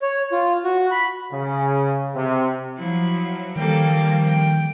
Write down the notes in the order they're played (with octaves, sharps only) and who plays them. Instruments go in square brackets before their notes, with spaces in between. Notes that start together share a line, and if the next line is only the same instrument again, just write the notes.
[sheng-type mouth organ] C#5
F4
F#4
B5
[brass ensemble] C#3
C3
[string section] F3 F#3 [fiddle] E4
[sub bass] D#3 [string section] F3 G3 A#3 [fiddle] A4 G5
[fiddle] G5